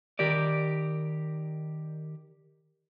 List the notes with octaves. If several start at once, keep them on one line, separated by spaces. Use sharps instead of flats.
D#3 G4 A#4 D5